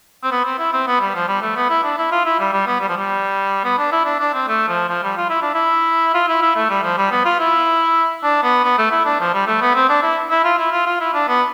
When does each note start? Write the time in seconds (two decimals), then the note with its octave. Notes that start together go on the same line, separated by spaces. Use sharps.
0.23 C4
0.31 B3
0.45 C4
0.59 E4
0.73 C4
0.87 B3
1.00 G3
1.15 F3
1.28 G3
1.42 A3
1.56 B3
1.70 E4
1.84 D4
1.98 E4
2.12 F4
2.26 E4
2.39 G3
2.53 G3
2.66 B3
2.81 G3
2.88 F3
2.97 G3
3.64 B3
3.78 D4
3.92 E4
4.05 D4
4.20 D4
4.34 C4
4.48 A3
4.68 F3
4.89 F3
5.03 G3
5.17 F4
5.30 E4
5.42 D4
5.54 E4
6.14 F4
6.28 E4
6.42 E4
6.56 A3
6.70 G3
6.83 F3
6.98 G3
7.11 B3
7.25 F4
7.39 E4
8.23 D4
8.43 B3
8.64 B3
8.78 A3
8.91 E4
9.06 D4
9.20 F3
9.34 G3
9.47 A3
9.61 B3
9.75 C4
9.89 D4
10.03 E4
10.31 E4
10.44 F4
10.59 E4
10.72 F4
10.86 F4
11.00 E4
11.14 D4
11.28 B3